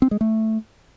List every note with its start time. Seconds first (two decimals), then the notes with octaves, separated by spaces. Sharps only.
0.02 C4
0.11 G#3
0.21 A3